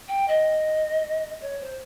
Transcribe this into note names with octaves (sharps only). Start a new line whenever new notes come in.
G5
D#5
C#5
C5